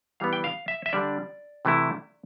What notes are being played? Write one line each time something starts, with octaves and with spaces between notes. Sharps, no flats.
E3 G3 B3 F5
G5
F5
E5
E5
D3 G3 D4 D5
C3 E3 A3 E4